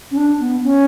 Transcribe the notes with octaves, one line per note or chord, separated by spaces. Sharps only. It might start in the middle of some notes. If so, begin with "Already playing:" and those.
C#4
D4
B3
C#4